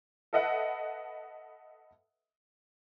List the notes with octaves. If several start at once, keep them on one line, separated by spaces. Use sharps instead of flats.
A4 B4 D#5 E5 F#5